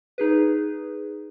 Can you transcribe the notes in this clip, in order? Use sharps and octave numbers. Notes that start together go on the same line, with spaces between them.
D#4 G#4 B4